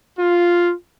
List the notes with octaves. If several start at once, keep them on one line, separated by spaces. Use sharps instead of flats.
F4